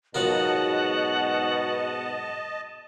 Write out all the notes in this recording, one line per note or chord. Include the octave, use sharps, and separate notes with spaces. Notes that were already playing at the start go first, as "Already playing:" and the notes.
G#2 B2 F#3 F4 A#4 D#5 F#5 A5